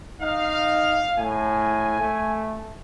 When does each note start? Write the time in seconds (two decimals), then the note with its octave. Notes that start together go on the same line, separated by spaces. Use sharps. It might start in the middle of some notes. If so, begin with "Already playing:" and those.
0.21 D#4 F5
1.18 A2 G#5
2.01 A3